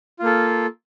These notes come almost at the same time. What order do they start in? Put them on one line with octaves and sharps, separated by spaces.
F4 A#3 A4